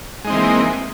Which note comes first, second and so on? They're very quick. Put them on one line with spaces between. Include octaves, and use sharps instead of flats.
G#3 D#4 C4 E3 A#3